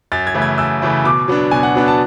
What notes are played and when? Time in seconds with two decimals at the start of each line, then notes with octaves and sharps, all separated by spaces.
0.12 F#2 A6
0.27 G#6
0.34 C#3 E3 A3 E4
0.42 G#6
0.58 F#2 E6
0.82 C#3 E3 A3 E4
1.05 B2 D6
1.28 F#3 B3 D4
1.51 B2 G#5
1.63 F#5
1.75 F#3 B3 D4
1.88 A5